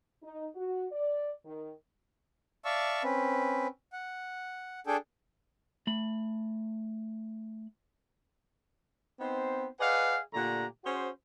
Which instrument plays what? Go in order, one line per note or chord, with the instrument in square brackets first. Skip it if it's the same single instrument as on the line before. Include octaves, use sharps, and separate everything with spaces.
[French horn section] D#4
F#4
D5
D#3
[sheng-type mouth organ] D5 E5 F5 A5 C#6 E6
C4 C#4 B4
F#5
D4 G#4 A4 G5
[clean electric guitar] A3 B5
[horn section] B3 C4 D#4 C5
G#4 B4 D5 D#5 F5 F#5
A#2 D3 A3 G4 F#5 A#5
C#4 F#4 G#4 C5